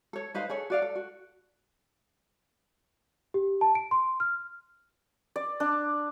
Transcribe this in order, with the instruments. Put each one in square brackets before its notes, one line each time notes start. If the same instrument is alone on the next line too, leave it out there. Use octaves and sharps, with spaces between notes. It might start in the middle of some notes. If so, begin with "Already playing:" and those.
[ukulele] A4 C#5
D#4 B4 C5 F5
G#4 A4 C#5
F#4 D5 F5
A4
F#4
[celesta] G4
A5
D7
C6
F6
[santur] D5
D4